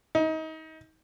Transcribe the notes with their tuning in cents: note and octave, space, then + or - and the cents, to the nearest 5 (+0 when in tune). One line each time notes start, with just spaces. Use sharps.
D#4 +30